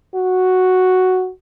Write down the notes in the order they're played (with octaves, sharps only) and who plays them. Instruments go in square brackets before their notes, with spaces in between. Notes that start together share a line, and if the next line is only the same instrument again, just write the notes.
[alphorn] F#4